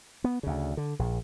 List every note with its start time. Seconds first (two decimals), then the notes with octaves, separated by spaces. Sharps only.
0.24 B3
0.43 D2 C#3
0.77 D3
0.99 A#1